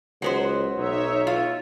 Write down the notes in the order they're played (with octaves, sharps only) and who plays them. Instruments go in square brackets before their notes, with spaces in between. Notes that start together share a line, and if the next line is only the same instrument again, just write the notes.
[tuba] C#2 [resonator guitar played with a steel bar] F#3 B3 C5
[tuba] B1 [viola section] D#4 C#5 E5
[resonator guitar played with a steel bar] F4